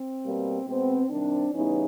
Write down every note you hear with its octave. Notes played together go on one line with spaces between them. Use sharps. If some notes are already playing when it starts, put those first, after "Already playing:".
Already playing: C4
B2 G3 A#3
B2 G#3 B3 C4
C3 D#3 G3 C4 D4
E2 C#3 E3 G3 B3 C#4 D#4